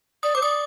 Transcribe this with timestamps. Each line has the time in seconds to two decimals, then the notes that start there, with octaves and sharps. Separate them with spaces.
0.23 D5 D#6
0.35 C5 D6
0.42 D5 D#6